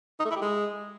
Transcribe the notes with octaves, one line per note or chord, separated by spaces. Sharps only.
D#4
A3
E4
G4
G#3